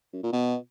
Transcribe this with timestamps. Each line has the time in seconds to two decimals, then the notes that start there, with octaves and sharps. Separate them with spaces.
0.13 F#2
0.23 A#2
0.33 B2